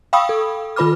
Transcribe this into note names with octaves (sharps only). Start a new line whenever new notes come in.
F5 G5 B5 C#6 D#6 E6
A4
D#3 F4 B4 B5 D6 F6